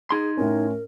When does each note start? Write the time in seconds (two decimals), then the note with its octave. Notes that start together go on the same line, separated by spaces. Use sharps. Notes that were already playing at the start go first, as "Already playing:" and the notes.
0.11 D#4 G#4 C6
0.37 A2 C#4 A#4